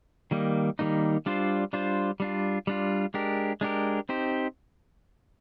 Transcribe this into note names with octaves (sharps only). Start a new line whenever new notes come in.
D#3 G3 A#3 D#4
D#3 G3 A#3 D#4
G3 D4 F4 C5
G3 D4 F4 C5
G3 D4 F4
G3 D4 F4
G#3 D4 G4 A#4
G#3 D4 G4 A#4
C4 D#4 G4 C5